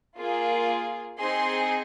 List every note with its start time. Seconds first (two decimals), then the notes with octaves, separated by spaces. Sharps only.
0.18 A#3 F4 G#4
1.19 C4 D#4 G#4 C6